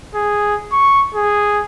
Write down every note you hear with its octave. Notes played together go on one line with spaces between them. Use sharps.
G#4
C#6
G#4